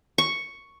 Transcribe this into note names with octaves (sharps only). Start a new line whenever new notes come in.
C#6